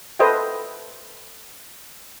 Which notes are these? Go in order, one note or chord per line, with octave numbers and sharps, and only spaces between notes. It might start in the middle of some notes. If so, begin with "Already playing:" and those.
A4 B4 C5 D#5 E5 G5